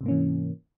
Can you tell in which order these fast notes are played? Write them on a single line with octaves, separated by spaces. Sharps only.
C3 G#2 A#3 C#4 E3